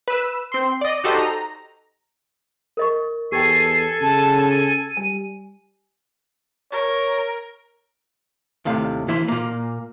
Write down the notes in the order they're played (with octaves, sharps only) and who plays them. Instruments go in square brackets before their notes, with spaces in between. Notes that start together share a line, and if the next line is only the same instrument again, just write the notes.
[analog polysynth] B4 E6
C4 C6
D5 D#5
D#4 F#4 G4 A4 C5 D#5
A#5
[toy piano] A#4 D#5 C#6
[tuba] E2 [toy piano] G4 G5 [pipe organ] A4 G#5 [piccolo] C7
[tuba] C#3 [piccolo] A5
[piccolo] D#7
[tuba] G3 [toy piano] G#5
[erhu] A#4 [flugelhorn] C#5
[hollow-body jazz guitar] D#2 A2 C3 F5
E3 A#3 E4 C5
A#2 A#3